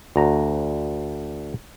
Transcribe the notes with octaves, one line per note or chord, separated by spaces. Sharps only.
D2 A#5